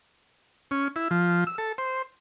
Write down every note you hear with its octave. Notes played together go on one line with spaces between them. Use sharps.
C#4
E4
F3
E6
A4
C5